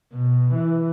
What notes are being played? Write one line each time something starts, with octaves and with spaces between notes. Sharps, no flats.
B2
E3